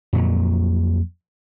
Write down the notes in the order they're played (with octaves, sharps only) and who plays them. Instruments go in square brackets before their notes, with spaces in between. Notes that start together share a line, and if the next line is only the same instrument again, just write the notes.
[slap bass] F2 A#2 F#3